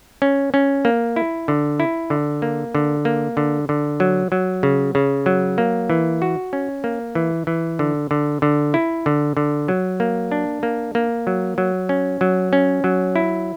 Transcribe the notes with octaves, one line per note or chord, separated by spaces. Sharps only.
C#4
C#4
A#3
E4
D3
E4
D3
A#3
D3
A#3
D3
D3
F#3
F#3
C#3
C#3
F#3
A#3
E3
F#4
C#4
A#3
E3
E3
D3
D3
D3
E4
D3
D3
F#3
A#3
D4
A#3
A#3
F#3
F#3
C#4
F#3
C#4
F#3
E4